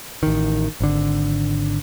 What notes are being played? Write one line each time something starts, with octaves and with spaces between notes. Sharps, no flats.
A1 D#3
G#1 D3